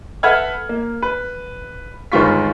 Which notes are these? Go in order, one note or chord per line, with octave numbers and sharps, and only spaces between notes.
A4 B4 E5 F#5 F6 G#6
A#3
B4
G1 D#3 G#3 F4 C#6 B6